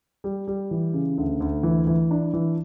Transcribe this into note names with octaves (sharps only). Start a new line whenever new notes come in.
G3
G3
E3
C#3
D2
D2
E3
E3
D4
E3